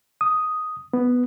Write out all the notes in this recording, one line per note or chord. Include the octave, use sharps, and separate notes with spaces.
D#6
B3